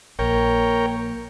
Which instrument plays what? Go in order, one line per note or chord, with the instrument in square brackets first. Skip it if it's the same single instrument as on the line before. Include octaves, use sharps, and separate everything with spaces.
[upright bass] A#1 [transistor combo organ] A#4 C#5 G5